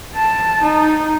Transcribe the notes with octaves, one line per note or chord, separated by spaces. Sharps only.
A5
D#4